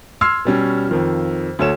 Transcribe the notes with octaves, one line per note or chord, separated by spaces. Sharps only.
C6 E6 F6 G#6 C7
B2 G3 C#4
F2 D#3 F3
D2 A4 C#5 E7